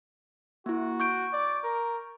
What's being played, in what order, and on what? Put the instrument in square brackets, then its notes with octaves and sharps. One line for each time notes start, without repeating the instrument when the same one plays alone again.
[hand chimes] A#3 E4 [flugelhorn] F#4
[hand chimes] C#6 G6 D7
[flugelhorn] D5
A#4